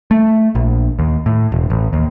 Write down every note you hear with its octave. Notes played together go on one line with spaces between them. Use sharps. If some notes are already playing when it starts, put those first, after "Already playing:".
A3
A#1
D#2
A2
E1
A1
D#2